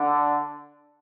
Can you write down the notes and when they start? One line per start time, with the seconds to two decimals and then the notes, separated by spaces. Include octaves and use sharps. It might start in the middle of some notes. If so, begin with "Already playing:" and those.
Already playing: D3